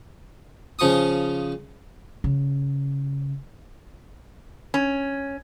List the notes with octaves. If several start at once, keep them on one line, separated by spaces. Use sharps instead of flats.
C#3 F3 C#6 D#6
C#3
C#4